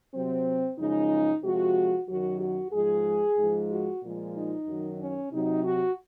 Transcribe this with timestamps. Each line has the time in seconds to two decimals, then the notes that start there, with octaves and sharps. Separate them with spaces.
0.14 C3 F#3 C4
0.78 F#2 C#3 F3 G#3 D#4
1.43 C3 F3 G#3 F#4
2.08 F#2 D#3 F#3 F#4
2.40 F#4
2.72 G#2 F3 G#3 G#4
3.37 G#2 F3 G#3
3.69 F#4
4.02 A#2 F3 G#3
4.35 D#4
4.67 F#2 D#3 F#3
5.00 C#4
5.31 C3 F#3 D#4
5.64 F#4